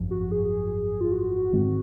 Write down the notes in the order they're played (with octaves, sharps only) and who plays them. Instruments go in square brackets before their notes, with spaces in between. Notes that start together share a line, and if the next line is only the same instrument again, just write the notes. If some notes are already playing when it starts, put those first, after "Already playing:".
Already playing: [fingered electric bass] G#1 F#2 F3
[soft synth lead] F#4
G#4
F4
F#4
[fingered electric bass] G#2 D#3 G#3 C4